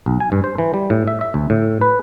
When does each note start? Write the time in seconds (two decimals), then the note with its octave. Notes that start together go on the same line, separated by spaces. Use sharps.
0.06 B1
0.20 G#5
0.32 G2
0.44 C5
0.58 E3
0.74 G3
0.90 A2
1.07 E5
1.21 E5
1.34 D2
1.50 A2
1.81 B4